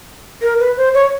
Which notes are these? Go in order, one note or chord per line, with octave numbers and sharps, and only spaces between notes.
A#4
B4
C5
C#5